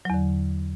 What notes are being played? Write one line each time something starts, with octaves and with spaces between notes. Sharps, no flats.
E2 D3 F#3